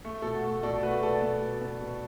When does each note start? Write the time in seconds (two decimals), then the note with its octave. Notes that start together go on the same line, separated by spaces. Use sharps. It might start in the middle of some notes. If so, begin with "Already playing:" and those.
0.05 A3
0.22 B2 A4
0.34 F#4
0.43 A3
0.63 B2 A4 D5
0.83 A3 F#4 B4
1.02 B2 A4 D5
1.21 B3
1.42 B2
1.61 B3
1.81 B2